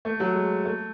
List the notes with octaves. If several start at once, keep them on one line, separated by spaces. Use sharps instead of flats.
A3
F#3
G#3
A3